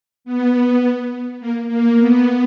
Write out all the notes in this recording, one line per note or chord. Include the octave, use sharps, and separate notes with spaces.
B3
A#3
A#3
B3